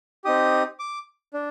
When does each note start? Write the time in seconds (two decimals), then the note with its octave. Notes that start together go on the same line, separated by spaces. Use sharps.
0.25 C4 D#4 G4 D#6
0.79 D6
1.34 D4